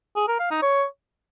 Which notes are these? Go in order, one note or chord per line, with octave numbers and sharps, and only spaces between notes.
G#4
A#4
F5
D#4
C#5